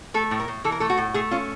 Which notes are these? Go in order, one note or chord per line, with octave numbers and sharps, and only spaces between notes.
A3 A4
A2
A#4
A2
E3 A4
A#4
A3 A4
F#4
A2
A3 G#4
C#4 F4